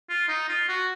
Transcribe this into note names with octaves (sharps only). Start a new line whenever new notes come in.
F4
D#4
F4
F#4